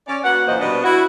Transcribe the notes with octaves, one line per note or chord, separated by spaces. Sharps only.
C#4 D5
A#3 F#4 B4 F#5
F#2 A#2 E3 A#3 C5 D#5
B2 G3 B3 D4 D#5
E4 F#4